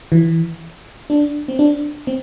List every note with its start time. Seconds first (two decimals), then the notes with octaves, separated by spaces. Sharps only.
0.12 E3
1.10 D4
1.48 C4
1.59 D4
2.07 C4